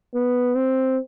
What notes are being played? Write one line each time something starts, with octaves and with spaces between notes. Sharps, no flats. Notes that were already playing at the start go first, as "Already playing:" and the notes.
B3
C4